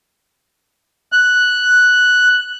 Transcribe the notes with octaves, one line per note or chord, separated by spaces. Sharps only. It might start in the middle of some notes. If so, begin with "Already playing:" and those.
F#6